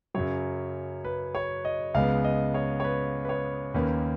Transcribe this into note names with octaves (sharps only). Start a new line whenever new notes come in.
F#2 C#3 F#3 C#5
B4
C#5
D#5
C#2 C#3 G#3 B3 F5
D#5
C#5
C#5
B4
B4
C#5
D#2 D#3 A#3 C#4 B4